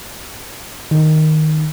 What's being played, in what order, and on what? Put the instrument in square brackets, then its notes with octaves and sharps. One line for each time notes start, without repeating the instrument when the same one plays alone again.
[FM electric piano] D#3